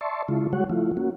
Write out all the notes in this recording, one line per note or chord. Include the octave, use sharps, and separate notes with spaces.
D5 E5 A5 C6 C#6
C#3 G#3 E4 F4
G3 G#3 F#4 C#5 F#5
F3 A3 E4 F4
A#3 C#4 F#4